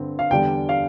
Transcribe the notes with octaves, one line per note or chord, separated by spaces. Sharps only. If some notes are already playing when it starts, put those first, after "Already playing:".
Already playing: G2 D3 C4
F5
E2 D3 G3 D4 G5
F5